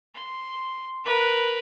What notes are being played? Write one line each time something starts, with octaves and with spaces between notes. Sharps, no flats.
C6
A#4 B4